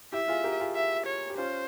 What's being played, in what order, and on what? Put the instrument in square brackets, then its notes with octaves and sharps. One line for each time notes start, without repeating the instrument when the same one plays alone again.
[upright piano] E4 G4 [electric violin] E5
[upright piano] F4 G#4
G4 A#4
F4 G#4
[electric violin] E5
C#5
[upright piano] G4
[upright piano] C#4 F4 [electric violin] C5